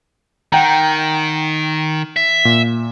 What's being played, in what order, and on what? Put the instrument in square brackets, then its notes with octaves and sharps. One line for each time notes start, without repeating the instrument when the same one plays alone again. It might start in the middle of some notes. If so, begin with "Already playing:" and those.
[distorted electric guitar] D#3 [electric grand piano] F#5 G5 A#5
[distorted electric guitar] E5
[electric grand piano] A#2